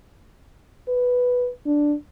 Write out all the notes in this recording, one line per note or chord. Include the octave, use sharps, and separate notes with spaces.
B4
D4